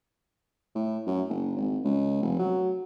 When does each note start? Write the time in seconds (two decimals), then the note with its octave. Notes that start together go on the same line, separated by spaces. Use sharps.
0.75 A2
1.06 F#2
1.29 F#1
1.56 G#1
1.84 C#2
2.22 F1
2.39 F#3